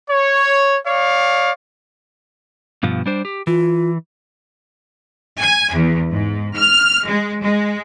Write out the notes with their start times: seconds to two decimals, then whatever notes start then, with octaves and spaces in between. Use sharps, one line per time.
0.10 C#5
0.86 C#5 D5 F5
2.83 G2 B2 F3
3.06 G3 D4 C5
3.25 G4
3.47 E3 F4
5.40 G#5
5.74 E2
6.10 G#2
6.56 F6
7.06 G#3
7.42 G#3